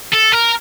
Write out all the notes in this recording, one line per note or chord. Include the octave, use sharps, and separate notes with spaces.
A4
A#4